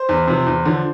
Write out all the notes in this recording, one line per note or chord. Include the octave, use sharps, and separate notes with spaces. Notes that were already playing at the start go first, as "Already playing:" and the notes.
Already playing: C5
E2
C3 F3
E2
D3 F3